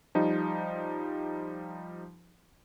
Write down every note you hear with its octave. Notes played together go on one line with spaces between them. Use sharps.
F3 G3 D#4